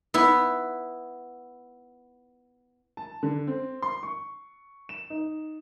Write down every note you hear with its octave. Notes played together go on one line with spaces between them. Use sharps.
B3 E4
A5
D3
C4
C6
C#6
E7
D#4